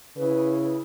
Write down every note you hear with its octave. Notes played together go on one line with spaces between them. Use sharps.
C#3 E4 B4